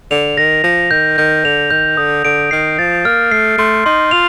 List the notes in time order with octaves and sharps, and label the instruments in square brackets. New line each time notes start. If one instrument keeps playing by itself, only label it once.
[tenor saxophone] D3 [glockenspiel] F7
[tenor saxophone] D#3 [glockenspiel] A#6
[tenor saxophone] F3 [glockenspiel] A#6
[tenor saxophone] D#3 [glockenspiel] G6
[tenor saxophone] D#3 [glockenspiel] G6
[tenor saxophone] D3 [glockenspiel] F7
[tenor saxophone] D#3 [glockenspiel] G6
[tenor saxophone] D3 [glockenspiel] D#6
[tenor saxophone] D3 [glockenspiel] D7
[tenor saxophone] D#3 [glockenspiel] C7
[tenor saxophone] F3 [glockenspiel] A6
[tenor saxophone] A#3 [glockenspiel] F6
[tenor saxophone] A3 [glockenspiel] C7
[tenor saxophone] A3 [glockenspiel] C6
[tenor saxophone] D#4 [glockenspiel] C6
[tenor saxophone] F4 [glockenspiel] F7